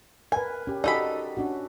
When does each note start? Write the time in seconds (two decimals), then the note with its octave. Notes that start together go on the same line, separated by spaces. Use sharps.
0.32 A#4 B4 G#5
0.67 C#4 G4
0.84 D#4 F#4 G4 A4 D5 B5
1.37 C#4 D4 F#4